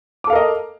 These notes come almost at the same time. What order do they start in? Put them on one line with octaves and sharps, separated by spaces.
D6 A4 F5 A#4 D#5